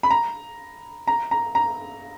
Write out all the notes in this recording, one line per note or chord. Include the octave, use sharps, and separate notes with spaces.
B5
A#5
A#5
A#5
A#5